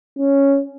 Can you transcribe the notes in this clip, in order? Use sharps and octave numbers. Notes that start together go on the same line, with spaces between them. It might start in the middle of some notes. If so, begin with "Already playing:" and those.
C#4